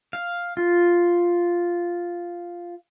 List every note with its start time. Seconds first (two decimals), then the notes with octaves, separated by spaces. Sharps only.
0.13 F5
0.57 F4